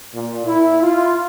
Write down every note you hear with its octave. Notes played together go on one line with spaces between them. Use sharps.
A#2
E4
F4